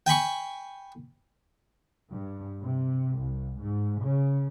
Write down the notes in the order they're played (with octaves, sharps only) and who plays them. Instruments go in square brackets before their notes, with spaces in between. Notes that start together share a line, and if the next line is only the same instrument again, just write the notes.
[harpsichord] G5 G#5 B5 C#6
[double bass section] G2
C3
C2
G#2
C#3